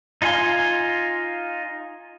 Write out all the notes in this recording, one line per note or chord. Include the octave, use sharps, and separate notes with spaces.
D#4 F4 F5 G#5 C6